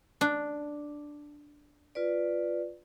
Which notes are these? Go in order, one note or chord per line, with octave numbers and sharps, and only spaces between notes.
D4
F4 B4 D5